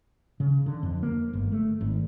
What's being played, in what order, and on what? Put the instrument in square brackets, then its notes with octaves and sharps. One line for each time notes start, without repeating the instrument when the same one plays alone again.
[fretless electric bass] C#3
D3
F2
A#3
G1
A3
G#1